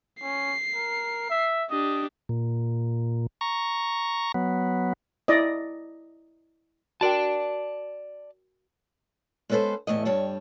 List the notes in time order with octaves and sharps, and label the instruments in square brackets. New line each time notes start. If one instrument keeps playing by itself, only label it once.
[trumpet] C#4 [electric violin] C7
[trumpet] A#4
E5
[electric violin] D4 G4 [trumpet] D#5
[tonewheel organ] A#2
A#5 C#6
F#3 B3
[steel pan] E4 D5 D#5
[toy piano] F#4 A#4 G5 [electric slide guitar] D5 A5
[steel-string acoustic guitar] G#3 B3 C#4 A4 B4 C5
E2 A2 A3 D#5
G2 G3 C#5 A5